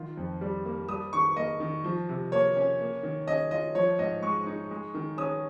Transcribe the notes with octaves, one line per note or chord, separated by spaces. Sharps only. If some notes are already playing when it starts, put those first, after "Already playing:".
Already playing: D#3 F4
F2
G3
A#3
G3 D#6
D#3 C#6
A#3 D#5
D#3
F3
C3
A#3 C#5
C#4
A#3
D#3
C#4 D#5
F4 D#5
F3 C#5
G#2 D#5
G#3 C#6
D#4
G#3
D#3
C#4 D#6